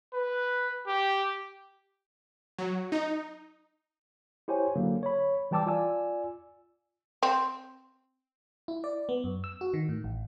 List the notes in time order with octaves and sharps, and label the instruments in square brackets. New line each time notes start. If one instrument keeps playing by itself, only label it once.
[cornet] B4
G4
[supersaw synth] F#3
D#4
[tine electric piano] E4 G4 C5 C#5 G#5
D3 F#3 A#3
C#5 B5
E3 G3 G5 A5 D6 E6
F4 D5 G#5 E6
[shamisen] C4
[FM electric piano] E4
D5
B3
F#2
E6
F#4
D#3
A2
A1